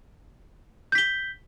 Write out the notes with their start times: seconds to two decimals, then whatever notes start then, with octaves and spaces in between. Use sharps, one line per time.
0.92 G6
0.95 B6
0.98 G7